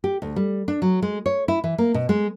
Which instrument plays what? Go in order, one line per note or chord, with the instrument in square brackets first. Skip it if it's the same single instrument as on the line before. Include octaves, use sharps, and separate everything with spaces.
[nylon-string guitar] G4
D2
G3
D4
F#3
G#3
C#5
E4
E3
A#3
B2
G#3